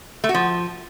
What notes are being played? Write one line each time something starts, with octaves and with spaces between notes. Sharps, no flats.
A3
F#4
F3